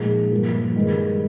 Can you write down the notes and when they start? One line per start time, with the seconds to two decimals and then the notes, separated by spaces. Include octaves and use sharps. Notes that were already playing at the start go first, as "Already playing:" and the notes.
Already playing: A#2 F3 G#3 D#4 G#4
0.31 G2 F3 A#3
0.76 G2 D#3 G#3